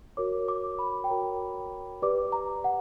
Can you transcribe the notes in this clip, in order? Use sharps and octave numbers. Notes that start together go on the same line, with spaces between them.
F#4 A#4 C#5 D6
D6
B5
G5
F#4 A#4 C#5 A#5
G4 B4 D5 D6
A#5
F#5